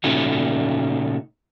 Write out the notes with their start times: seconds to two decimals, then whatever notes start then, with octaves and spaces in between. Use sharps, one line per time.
0.04 A#2 C#3 A3 C#4 D#4 F#4